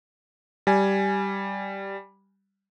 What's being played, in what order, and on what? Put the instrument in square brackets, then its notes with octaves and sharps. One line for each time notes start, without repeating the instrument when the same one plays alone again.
[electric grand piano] G3 G#5